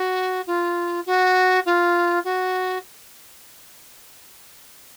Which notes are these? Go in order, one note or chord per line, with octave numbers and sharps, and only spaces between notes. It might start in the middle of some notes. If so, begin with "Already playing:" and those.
Already playing: F#4
F4
F#4
F4
F#4